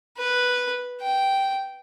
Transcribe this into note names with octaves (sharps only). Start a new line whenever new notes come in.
B4
G5